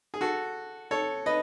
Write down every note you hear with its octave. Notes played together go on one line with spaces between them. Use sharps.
G#4
F#4 A4
A4 C#5
B4 D#5